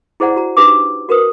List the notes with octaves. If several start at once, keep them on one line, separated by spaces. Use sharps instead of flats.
E4 G#4 C5 D5 F#5 A#5
F#4 A#5
D4 D#4 G4 B4 G#5 D6
F#4 A#4 B4 D#6